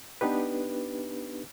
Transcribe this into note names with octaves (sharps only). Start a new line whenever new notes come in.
B3 D4 D#4 G4 B4